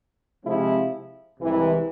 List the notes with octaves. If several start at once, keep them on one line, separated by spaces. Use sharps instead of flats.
C3 F3 G#3 C4 E4
C2 C3 E3 G#3